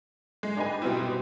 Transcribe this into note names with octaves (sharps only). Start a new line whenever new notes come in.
G#3
D4 D#4 G4 B4 G#5
B2 G3 B3 C4 E4